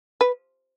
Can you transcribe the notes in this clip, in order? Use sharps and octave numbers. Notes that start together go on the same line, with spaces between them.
B4